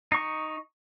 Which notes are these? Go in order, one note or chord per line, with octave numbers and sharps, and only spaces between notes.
D#4 C#6